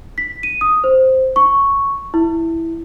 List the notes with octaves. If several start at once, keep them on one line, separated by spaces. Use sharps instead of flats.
B6
D#7
D#6
C5
C#6
E4